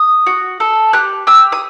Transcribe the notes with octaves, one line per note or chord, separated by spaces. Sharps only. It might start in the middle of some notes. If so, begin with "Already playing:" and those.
Already playing: D#6
F#4
A4
G4 F#6
G4 E6
D#6